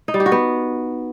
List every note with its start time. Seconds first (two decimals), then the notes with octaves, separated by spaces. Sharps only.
0.08 D#4
0.14 G3
0.20 G4
0.26 F#4
0.32 B3